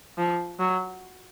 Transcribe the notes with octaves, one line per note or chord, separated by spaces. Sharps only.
F3
F#3